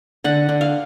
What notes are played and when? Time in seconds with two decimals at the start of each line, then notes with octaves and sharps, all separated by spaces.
0.24 D3 F#5
0.49 D3
0.61 F5